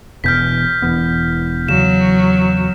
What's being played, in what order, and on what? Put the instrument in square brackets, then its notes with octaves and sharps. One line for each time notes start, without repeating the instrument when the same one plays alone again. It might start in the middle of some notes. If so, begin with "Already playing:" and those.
[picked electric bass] E1 E2 B2 [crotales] F6 G6 B6
[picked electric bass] E1 E3 B3
[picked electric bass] E2 C#3 [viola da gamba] F#3 [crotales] E7